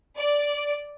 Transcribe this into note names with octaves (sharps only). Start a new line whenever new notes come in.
D5